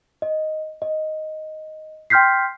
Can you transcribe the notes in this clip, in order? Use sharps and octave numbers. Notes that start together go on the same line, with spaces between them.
D#5
D#5
G5 C6 F6 G6 B6 C7